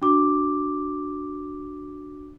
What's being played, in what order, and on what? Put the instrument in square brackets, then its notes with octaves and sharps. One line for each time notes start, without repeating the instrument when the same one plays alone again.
[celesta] D4 F#4 D6